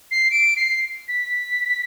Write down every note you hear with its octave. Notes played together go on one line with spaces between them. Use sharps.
C7
D7
C7
B6